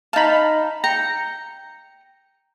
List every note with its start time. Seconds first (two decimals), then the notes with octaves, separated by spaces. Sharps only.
0.13 D#4 F5 A5 B5
0.84 G5 A#5 C#7